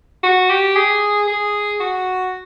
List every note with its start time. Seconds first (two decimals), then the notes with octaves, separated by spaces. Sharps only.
0.23 F#4
0.50 G4
0.75 G#4
1.27 G#4
1.80 F#4